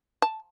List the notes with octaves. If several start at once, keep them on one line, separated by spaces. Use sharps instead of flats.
A5